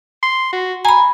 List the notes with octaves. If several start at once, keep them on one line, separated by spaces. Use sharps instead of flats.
C6
F#4
G#5 A#5 B5